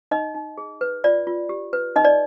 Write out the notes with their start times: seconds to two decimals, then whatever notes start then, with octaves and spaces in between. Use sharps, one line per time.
0.11 D#4 D#5
0.35 D#4
0.58 G#4
0.81 B4
1.04 F4 D5
1.27 F4
1.49 G4
1.73 B4
1.96 D#4 D#5
2.05 D5